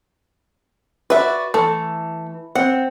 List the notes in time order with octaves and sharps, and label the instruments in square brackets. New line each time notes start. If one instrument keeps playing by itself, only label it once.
[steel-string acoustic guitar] F#4 D5 [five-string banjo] B4 E5
[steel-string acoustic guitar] E3 [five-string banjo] A3
[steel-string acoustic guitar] C4 [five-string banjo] F#5